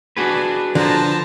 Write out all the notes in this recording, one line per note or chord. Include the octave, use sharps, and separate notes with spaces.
D4 F#4 G#4 B4
D3 F3 A5 A#5